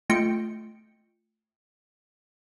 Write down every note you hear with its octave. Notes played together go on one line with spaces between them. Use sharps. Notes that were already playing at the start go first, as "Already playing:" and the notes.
A3 F4 D#5 G5 C#7